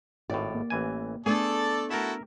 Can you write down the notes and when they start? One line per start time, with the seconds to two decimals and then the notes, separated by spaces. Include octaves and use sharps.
0.30 G#1 A2 G4 D5
0.55 A#3
0.70 A1 E3 G#5
1.26 A3 B3 D4 G#4 A4 D5 A5
1.90 E4 F#4 A4 A#4 E5